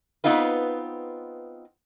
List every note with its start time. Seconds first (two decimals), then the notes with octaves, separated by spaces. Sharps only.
0.24 B3 C4 D#4 F4 B4